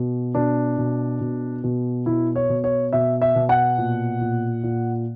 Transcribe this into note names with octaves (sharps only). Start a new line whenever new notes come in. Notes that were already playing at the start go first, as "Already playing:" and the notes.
Already playing: B2
B2 D4
B2
B2
B2
B2 E4
C#5
B2
C#5
B2 E5
E5
B2
F#5
A#2
A#2
A#2